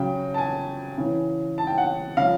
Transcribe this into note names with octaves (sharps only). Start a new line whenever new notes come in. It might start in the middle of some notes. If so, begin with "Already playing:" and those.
Already playing: C#3 F#3 G5
A5
G#5
C#3 E3
A5
G5
F#5
C#3 F3 F5